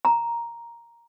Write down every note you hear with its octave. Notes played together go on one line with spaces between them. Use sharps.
A#5